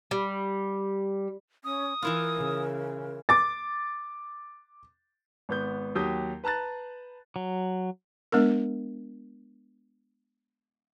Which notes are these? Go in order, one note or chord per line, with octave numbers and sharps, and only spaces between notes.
G3
C#4 D#6
E3 E4 F4 A#4
C#3
D6 A6
G#1 B3 G6
D#2 F#3 G4 D#6 G6
B4 A5 A#5 F#6 A6
F#3
G#3 B3 D4 A#4